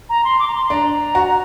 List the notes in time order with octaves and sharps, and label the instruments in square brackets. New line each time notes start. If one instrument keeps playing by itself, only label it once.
[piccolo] A#5
C6
D6
A#5
C6
[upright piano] D4 [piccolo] A#5
[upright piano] F#4